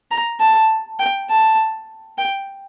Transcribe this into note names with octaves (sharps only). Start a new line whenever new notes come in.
A#5
A5
G5
A5
G5